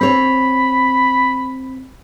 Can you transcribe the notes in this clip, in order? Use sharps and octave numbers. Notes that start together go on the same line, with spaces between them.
C4 C#5 B5